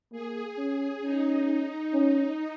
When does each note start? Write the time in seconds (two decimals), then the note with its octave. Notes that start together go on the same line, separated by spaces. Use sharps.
0.12 A#3 G#4
0.57 C#4 G#4
1.02 C#4 D#4
1.93 C#4